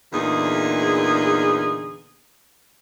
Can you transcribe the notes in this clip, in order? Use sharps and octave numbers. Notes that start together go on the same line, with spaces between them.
E2 A#2 D3 D#4 G#4